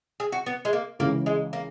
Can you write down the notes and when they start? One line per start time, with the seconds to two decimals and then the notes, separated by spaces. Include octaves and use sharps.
0.20 G#4
0.32 F#4
0.46 B3
0.65 G#3
0.73 A#3
0.99 C#2 C#3 E3 A#3
1.26 G#3
1.53 A#3